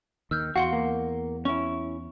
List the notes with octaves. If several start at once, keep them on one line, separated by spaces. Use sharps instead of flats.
D#2 D#3 E6 F6 G6
E2 F#4 F5 F#5 C6
A#3
C#4 E4 C#6